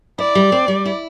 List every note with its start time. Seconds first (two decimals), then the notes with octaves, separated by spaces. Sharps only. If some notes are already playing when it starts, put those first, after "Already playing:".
0.19 E4 D5
0.35 G3
0.52 C4
0.68 G3
0.85 E4